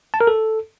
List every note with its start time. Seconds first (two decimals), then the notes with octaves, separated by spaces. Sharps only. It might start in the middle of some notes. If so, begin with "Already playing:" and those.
0.14 A5
0.21 A#4
0.27 A4